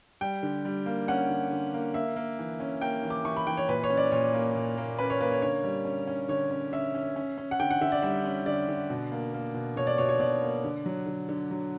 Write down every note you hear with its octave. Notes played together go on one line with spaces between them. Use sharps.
G3 G5
D3
G3
A#3
C#4 F#5
D3
D3
A#3
A#3 E5
A#3
E3
C#4
A#3 G5
E3
D6
E3 C#6
B5
E3 G5
C#5
A#2 B4
C#5
C#4
D5
A#2 C#5
A#3
A#2
A#3
C#4 B4
C#5
A#3 B4
C#5
D3 C#5
G3
C#4
C#4
D3 C#5
C#4
C#4 E5
C#4
C#4
C#4
F#5
D3 G5
F#5
D3 E5
D5
G3 E5
C#4
D3 D5
D3
B2
A#3
A#3
B2
B2 C#5
D5
B2 C#5
C#5
B2 D5
A#3
D3
F#3
D3
D3
F#3